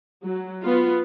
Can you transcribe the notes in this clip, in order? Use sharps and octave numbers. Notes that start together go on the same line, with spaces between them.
F#3
B3 F4